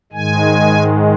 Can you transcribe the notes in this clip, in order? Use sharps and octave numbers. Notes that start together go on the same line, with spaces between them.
G#2 D#3 G#3 G#5